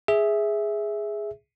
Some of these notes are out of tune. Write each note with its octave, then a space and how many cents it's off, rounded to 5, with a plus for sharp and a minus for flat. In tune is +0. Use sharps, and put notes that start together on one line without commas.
G#4 +0 E5 -5